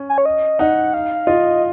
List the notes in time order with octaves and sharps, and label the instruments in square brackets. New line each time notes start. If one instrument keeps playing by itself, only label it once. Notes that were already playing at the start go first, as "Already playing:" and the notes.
Already playing: [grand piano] C#4
[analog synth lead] G#5
C#5
D#5
[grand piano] D#4 [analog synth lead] F#5
[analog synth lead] F5
[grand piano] F4 [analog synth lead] D#5